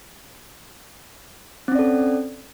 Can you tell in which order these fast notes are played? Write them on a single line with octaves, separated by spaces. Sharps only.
C4 C#4 D5 A4